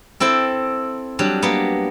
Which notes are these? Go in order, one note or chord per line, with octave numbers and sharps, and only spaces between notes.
C4 E4 A4 G5
F#3 G3 D4
A#3 B3